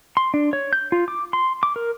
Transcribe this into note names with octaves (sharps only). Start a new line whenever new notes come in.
C6
D4
C#5
G6
F4
D6
C6
D6
A#4